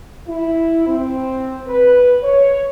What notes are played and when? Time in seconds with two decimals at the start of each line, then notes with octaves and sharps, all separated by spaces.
0.28 E4
0.87 C4
1.67 B4
2.23 C#5